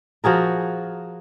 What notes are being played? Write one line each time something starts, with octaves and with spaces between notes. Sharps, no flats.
F3 F#4 G#4 A#4